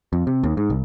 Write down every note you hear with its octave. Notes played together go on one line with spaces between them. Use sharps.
F2
C3
D#2
G#2
C2